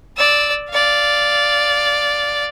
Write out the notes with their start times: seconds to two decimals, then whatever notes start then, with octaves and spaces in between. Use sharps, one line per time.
0.17 D5 E6
0.70 D5 F5